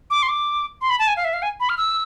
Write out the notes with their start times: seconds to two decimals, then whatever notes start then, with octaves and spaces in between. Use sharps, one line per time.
0.10 D6
0.23 C6
0.28 D6
0.81 C6
0.90 B5
0.99 A5
1.08 G#5
1.17 F5
1.25 E5
1.33 F5
1.42 G#5
1.60 B5
1.69 F6
1.78 E6